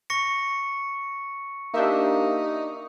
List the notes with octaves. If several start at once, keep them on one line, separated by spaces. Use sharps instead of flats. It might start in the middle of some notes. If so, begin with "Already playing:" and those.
C#6 A#6 C#7
A#3 D4 D#4 G4 E5